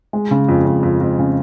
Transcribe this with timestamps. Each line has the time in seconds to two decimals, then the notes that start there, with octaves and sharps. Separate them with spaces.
0.13 G#3
0.31 C#3
0.49 F2
0.65 F2
0.83 F2
1.01 F2
1.19 C#3